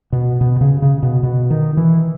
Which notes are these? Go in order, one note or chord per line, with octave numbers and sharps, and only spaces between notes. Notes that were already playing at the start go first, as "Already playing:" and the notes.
B2
B2
C#3
C#3
B2
B2
D#3
E3